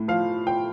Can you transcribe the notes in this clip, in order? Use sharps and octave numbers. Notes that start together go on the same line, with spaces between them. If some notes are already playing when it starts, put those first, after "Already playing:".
Already playing: A2
F3 F5
F3 G5